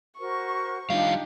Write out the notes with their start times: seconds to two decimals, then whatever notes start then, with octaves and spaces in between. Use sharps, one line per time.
0.19 F#4 A#4 C5 C#6
0.90 G3 D4 D#4 F4 G4 F5